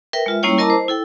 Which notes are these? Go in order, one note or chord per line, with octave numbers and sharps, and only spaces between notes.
A#4 B4 E5 G5
G#3 F4 E5
G3 A#3 C#4 E4 C#5 G5
E4 A#4 D#5 A5 A#5 D6
C5
E4 A4 G5